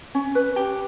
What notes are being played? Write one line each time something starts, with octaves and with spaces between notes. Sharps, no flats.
C#4
B4
G4